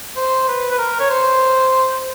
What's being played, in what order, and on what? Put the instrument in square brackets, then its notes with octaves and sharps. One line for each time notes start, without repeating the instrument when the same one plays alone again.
[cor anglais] C5
B4
B4
A#4
C#5
C5